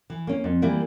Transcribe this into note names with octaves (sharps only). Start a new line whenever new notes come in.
E3
A#3 C#4
F2
E3 G3 A#3 E4